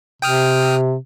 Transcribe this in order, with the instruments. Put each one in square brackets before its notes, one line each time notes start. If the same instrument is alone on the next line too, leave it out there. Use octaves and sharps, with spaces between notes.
[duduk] C3 [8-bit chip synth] G5 D#6 F6